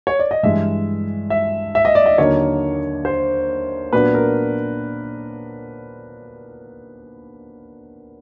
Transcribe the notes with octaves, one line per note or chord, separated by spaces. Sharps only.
C#5
D5
D#5
G2 E3 G#3 E5
E5
E5
D#5
D5
D#5
D#2 D3 F#3 A#3 D#4 C#5
C5
A#2 F#3 B3 D4 B4
A#4